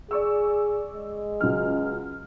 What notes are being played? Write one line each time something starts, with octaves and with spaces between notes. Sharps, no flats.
G#4 D5 C#6 E6
G#3
C#2 F#3 F6